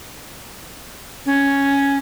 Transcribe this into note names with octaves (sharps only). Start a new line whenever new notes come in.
C#4